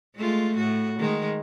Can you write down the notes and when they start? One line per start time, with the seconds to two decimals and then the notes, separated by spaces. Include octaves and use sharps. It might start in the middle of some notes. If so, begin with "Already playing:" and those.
0.16 G#3 A3 F4
0.57 A2 F#4
0.99 D#3 G#3